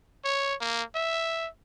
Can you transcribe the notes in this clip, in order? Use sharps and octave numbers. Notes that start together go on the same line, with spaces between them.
C#5
A#3
E5